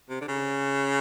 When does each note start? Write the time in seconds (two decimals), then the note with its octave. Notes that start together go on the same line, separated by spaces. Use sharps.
0.10 C3
0.21 D3
0.28 C#3